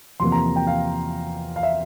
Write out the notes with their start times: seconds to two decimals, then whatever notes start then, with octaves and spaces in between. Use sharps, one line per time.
0.20 E2 C3 F3 A#3 C6
0.32 A#5
0.56 G5
0.67 F5
1.56 F5
1.63 E5